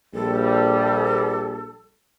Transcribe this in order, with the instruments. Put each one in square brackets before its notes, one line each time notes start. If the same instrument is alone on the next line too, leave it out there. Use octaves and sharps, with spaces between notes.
[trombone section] A#1 G3 [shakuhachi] A4